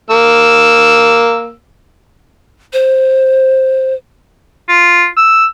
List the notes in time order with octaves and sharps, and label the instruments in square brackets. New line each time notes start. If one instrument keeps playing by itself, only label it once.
[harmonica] A#3 E6
[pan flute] C5
[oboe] F4
E6